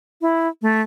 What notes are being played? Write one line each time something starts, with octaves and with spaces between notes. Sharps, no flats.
E4
A3